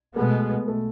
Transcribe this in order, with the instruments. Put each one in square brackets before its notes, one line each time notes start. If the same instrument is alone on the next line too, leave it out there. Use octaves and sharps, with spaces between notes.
[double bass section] B2 G#3 B3 [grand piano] A3
[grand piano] A3